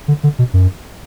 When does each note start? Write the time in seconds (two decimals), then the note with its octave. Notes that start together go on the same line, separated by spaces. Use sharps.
0.08 D3
0.23 D3
0.39 B2
0.54 F#2